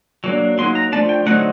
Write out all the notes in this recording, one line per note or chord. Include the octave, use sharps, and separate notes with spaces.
F#3 A#3 D4
F#3 A#3 D#4 C6
A#5
F3 A3 D4 A5
G5
D3 F#3 A3 C4 D#4 F#5